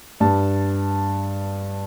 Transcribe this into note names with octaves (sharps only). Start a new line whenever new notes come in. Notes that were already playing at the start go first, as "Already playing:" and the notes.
G2 G3 A5